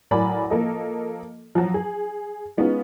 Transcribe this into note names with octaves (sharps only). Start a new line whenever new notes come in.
A2 F#3 A#4 D5 G#5 B5
F3 A#3 A4 D#5
F3 F#3
G#4
G#3 B3 C#4 D#4 F4